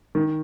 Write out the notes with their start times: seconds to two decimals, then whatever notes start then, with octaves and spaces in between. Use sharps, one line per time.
0.15 D#3